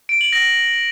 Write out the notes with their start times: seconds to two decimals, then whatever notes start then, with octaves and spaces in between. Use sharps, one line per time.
0.09 D7
0.21 F#7
0.33 A#6